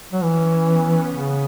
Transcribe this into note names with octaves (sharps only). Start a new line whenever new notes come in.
F#3
E3 C#4
B3
C#3 B3